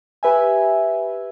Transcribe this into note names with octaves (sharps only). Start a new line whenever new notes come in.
G4 B4 E5 G#5